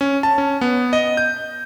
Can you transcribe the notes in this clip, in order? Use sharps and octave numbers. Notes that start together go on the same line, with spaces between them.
C#4
A5
C#4
B3
D#5
G6